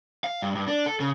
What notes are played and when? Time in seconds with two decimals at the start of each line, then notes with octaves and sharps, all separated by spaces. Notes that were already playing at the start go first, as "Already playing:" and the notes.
0.24 F5
0.42 G2
0.55 G2
0.68 D4
0.86 A4
1.00 C#3